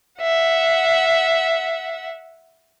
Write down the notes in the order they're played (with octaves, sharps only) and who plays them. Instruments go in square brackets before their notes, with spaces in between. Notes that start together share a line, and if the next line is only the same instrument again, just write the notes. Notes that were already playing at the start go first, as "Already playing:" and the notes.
[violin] E5 F#5